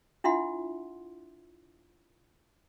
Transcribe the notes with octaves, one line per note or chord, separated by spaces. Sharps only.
D4 E4 F4 E5 F#5 C6